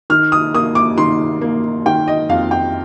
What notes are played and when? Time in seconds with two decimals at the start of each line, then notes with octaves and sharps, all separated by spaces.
0.10 D#3 F6
0.32 D#6
0.55 A#3 D#6
0.75 D6
0.97 D#3 C6
1.41 A#3
1.85 D#3 G5
2.08 D#5
2.29 F2 F5
2.51 G5